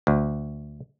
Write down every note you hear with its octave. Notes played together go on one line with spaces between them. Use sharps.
D2